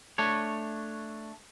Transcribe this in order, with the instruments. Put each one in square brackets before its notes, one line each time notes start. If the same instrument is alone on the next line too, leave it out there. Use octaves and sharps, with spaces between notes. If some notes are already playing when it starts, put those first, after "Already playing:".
[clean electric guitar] A3 D4 C#5